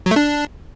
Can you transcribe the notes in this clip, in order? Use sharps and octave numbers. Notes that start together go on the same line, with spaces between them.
F#3
A3
D4